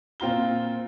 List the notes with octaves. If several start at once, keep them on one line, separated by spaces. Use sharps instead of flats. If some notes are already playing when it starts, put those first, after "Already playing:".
A#2 C4 F4 A#5 G7